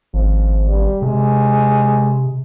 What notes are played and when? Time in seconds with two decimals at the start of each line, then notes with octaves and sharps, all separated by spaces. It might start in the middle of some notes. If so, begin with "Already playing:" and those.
0.14 G#1 F3
0.67 G3
1.02 C3 G#3